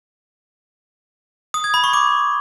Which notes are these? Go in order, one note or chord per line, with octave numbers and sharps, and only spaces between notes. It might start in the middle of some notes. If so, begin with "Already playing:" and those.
D#6
G#6
B5
C#6
D6